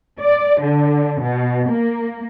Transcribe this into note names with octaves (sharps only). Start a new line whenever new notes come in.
D5
D3
B2
A#3